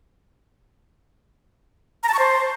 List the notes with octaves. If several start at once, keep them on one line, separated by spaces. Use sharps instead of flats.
A#5
A5
C#6
C5